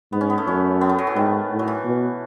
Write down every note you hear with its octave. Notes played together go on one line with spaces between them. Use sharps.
G#2 B3
C#4
B3
A3
F#2 C#4
B3
A3
F#3
E3
G#2 D#3
A2
F#3
E3
B2